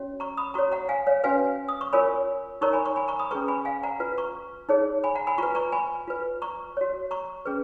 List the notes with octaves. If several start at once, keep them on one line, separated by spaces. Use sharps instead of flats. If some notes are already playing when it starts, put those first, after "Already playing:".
Already playing: C#4 F#4 C#5
A#5 C#6
B5 D#6
F#4 C#5 A#5 C#6
F#5 A#5
F5 G#5
C#5 F5
C#4 F#4 B4 F5 G#5
D#6
C#6
F4 A#4 C#5 G#5 B5
D#4 A#4 C#5 A#5 C#6
G#5 B5
A#5 C#6
G#5 B5
A#5 C#6
B5 D#6
C#4 G#4 B4 A#5 C#6
G#5 B5
F5 G#5
F#5 A#5
F4 B4
A#5 C#6
D#4 G#4 C#5
G#5 B5
F#5 A#5
G#5 B5
F4 B4 A#5 C#6
A#5 C#6
G#5 B5
F4 B4
A#5 C#6
F#4 C#5
A#5 C#6
C#4 G#4 B4